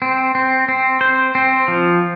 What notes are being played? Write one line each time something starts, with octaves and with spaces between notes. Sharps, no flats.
C4
C4
C4
C5
C4
F3